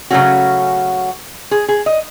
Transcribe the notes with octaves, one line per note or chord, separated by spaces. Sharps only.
C#3 F#3 A3 C#4 F#4
G#4
G#4
D#5